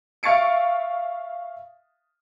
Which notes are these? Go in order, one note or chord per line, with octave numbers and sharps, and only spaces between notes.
E5 F5 C#6 A6 C#7 D7